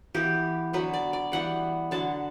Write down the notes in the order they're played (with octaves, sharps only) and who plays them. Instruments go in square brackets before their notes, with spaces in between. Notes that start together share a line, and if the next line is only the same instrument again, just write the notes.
[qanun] E3 B3 G4
D3 F#3 B3 B4
D5
D5
E3 G3 B3 F#5
D3 F#3 B3 A5